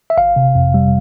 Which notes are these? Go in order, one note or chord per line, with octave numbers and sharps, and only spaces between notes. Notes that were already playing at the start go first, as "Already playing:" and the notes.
E5
G1 F5
C3
F2
G3